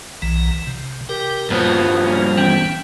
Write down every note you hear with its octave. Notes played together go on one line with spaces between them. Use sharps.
B1 E3 A#5
C3
G4 A#4 G5
G2 F3 A#3 B3
A#3 C#4
E3 B3 C#4 G5